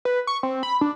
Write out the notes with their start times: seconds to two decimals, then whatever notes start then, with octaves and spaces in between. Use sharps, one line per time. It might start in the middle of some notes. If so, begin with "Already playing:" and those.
0.05 B4
0.27 C#6
0.43 C4
0.63 B5
0.81 D4